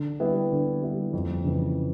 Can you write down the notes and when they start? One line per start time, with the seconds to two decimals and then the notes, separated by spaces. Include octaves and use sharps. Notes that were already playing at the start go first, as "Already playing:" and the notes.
Already playing: D3
0.20 G3 B3 E4
0.52 D3
0.82 G3 B3 E4
1.13 F2
1.44 C#3 E3